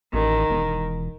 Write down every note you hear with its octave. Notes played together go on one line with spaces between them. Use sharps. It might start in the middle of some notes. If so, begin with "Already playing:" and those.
A1 D#3
E1